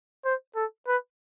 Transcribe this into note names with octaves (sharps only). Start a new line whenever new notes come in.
C5
A4
B4